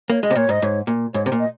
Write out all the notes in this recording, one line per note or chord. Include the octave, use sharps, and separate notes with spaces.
A#3 C#5
G#3 D#5
C3
A#2 C#5
G#2 D#5
G#2 C#5
A#2
G#2 C#5
C3
A#2
D#5